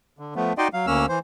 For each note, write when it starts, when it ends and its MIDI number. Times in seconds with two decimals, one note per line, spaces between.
0.19 0.34 50
0.36 0.53 53
0.36 0.53 57
0.36 0.53 59
0.58 0.68 63
0.58 0.68 66
0.58 0.68 74
0.58 0.68 75
0.58 0.68 79
0.58 0.68 84
0.73 0.86 54
0.73 0.86 77
0.87 1.06 38
0.87 1.06 58
0.87 1.06 61
0.87 1.06 88
0.87 1.06 89
1.09 1.19 52
1.09 1.19 72